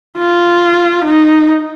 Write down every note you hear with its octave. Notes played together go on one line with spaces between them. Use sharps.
F4
D#4